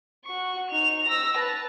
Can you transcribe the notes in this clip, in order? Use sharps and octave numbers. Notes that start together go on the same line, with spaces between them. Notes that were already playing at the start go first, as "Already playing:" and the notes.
F#4 C#6
D#4 F7
E6 A#6
B4 A5